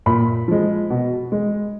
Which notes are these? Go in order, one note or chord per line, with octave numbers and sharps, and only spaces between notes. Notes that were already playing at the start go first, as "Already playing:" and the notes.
A#2 B5
F3 G#3
B2
G#3